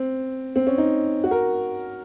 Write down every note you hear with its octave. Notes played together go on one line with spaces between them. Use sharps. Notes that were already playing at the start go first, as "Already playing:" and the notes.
Already playing: C4
C4
C#4
D#4
F#4
A#4